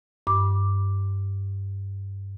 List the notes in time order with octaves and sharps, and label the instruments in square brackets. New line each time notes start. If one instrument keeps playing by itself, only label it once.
[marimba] G2 D6